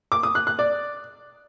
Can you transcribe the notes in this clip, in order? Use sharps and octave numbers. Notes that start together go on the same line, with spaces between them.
D6
D#6
F#6
F#6
D5